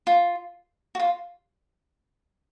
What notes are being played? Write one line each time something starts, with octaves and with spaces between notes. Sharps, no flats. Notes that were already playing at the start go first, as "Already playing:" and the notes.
F4
F#4
F4